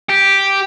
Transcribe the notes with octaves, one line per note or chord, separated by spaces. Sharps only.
G4